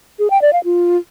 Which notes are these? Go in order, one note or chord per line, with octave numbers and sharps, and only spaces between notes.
G#4
G5
D5
F5
F4